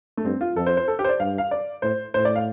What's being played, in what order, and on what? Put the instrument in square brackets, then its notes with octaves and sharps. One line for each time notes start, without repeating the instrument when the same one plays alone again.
[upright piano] A3
[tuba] G2 [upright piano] C4
[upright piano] F4
[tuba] F2 [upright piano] A4
[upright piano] C5
C5
A4
G4
C5
D5
[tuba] G2 [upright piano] F5
[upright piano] F5
D5
[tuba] A2 [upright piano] C5
[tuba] A2 [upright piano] C5
[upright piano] D5
F5